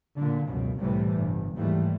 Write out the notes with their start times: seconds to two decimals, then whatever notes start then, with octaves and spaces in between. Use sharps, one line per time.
0.16 A#2 D3
0.48 C#2 F#2 B2
0.79 C2 A2 C3 E3 G3 A3
1.15 G1
1.55 D#2 G#2 E3 G3 A3